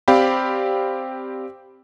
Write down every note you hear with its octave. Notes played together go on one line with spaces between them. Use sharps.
C4 G4 D5 F5 G5 B5